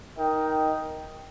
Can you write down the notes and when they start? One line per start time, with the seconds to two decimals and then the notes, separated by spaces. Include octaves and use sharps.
0.17 D#4 A#4 D#5 G5